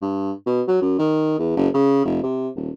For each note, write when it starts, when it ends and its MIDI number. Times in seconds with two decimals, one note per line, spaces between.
0.02 0.32 43
0.46 0.62 47
0.68 0.81 54
0.82 0.97 42
0.99 1.35 51
1.39 1.52 40
1.57 1.68 30
1.74 2.04 49
2.05 2.18 29
2.23 2.49 48
2.56 2.70 27